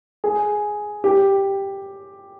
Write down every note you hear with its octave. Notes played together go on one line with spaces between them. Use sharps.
G#4
G4